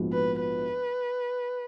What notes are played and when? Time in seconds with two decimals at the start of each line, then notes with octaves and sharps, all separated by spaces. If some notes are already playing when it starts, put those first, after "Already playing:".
Already playing: A#1 G#2 F3 B3 F#4
0.13 B4
0.41 B4